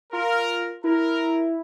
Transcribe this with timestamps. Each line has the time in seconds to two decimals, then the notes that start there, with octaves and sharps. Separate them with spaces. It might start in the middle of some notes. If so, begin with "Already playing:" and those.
0.12 F4 A#4
0.84 E4 A#4